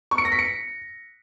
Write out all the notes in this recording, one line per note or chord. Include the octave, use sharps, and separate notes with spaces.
C#6
C#7
A#6
B6
C#7